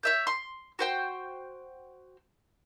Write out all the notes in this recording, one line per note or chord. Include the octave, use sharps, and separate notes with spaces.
C#5 E5 G6
C6
F#4 C5 G5